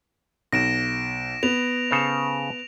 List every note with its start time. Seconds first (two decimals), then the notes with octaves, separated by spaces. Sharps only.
0.52 B1 A#6 D7 E7
1.43 B3 F7
1.91 C#3 A4 C5